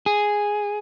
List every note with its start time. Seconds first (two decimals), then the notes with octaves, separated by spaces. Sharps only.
0.06 G#4